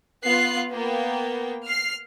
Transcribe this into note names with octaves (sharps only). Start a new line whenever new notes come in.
B3 F4 F5 F#6 C7
A#3 B3 G5
F6 C7